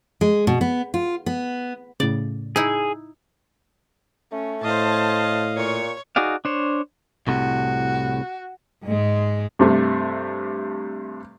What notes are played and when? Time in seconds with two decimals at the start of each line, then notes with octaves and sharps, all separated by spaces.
0.21 G#3
0.47 B2
0.61 B3
0.94 F4
1.26 B3
2.00 A2 C#3 D5
2.56 D#4 E4 G#4
4.32 A3 C#4
4.64 A2 C5 D#5 F5 A5
5.56 A#2 C#5 C#6
6.16 D#4 F#4 G#4 D5 F5
6.45 D4 C5 C#5
7.27 C2 A2 C3 F#4
8.85 G#2 G#3
9.59 G2 C3 A3